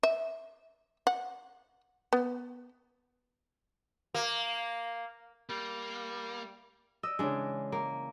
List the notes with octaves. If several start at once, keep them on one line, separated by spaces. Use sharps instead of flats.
E5
F#5
B3
A#3
G3 A#3
D5 D#5 E6
C#3 E3 G#3 D4
A#3